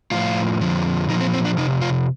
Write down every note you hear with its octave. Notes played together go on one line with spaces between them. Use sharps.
A2 F3 F4
F2 D3 F3
A#2 F3 D#4
C4
C4
D4
F2 C3 D#4
F4